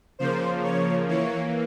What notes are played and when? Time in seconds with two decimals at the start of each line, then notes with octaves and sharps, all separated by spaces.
0.19 C#3 F3 A#3 C5
0.63 C#5
1.08 E3 A#3 C#5